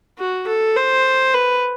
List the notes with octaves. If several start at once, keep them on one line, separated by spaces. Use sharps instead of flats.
F#4
A4
C5
B4